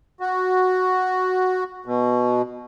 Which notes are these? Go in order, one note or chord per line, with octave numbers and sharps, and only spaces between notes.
F#4
B2